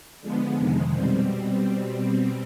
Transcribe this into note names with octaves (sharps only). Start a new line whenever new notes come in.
D3 F3 G#3 B3
F2 C3 D#3 G#3
B2 G3 C4